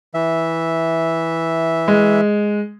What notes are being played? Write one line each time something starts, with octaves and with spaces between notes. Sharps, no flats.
E3 E5
G#3